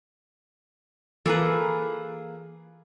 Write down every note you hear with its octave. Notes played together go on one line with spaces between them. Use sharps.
E3 A#3 F4 G#4 A4 B4 A#5